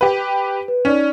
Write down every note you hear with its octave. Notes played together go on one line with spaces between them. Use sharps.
G4 B4
B4
C#4 D#4 D5